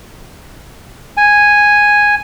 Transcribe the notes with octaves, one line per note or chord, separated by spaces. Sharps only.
G#5